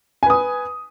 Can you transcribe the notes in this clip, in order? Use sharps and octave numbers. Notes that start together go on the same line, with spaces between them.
B4 G#5 D#6